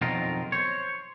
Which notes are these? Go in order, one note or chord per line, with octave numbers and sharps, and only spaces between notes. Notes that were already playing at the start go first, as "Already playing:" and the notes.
B1 F2 D3 D#3 F4 A#4
C5 C#5